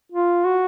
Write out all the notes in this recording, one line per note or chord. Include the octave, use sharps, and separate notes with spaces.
F4
F#4